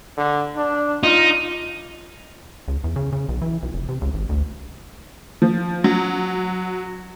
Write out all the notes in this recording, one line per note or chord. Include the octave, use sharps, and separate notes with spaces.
D3
D4
D#4 F4
C#2
E2
C#3
C#3
B1
E3
B1
F1
C3
C#2
G#1
D2
F3
F#3